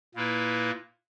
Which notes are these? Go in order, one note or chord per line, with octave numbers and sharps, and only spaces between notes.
A#2 A#3 E4 B4